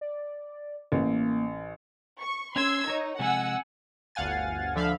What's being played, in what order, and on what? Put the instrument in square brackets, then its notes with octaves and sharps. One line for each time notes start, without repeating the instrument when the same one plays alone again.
[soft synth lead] D5
[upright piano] A1 [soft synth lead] A#3
[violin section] C#6
[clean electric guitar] C#4 [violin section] C6 E6 G#6
[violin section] D#4 [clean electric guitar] A#4 C#5
[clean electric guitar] C3 F3 G#3 [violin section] F#5 G#5 E6
[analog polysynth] G1 D2 F5 F#5 G#5 A6
D2 D3 F3 E5 F5 B5